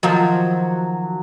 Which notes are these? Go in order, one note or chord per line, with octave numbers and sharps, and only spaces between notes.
D#3 F3 F#3